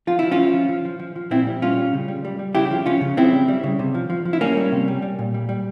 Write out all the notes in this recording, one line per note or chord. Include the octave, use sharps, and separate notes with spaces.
F3 F4
F3 E4
C#4 F4
F3
F3
F3
F3
F3
F3
A#2 C4 E4
G3
A#2 C#4 F4
G3
C#3
G3
G3
G3
C#3 E4 G4
F3
F3 C#4 F4
C#3
C#3 C4 E4
G3
G3
C#3
C3
F3
F3
F3
E4
G3 A#3 C#4
G3
C3
G3
G3
A#2
G3
G3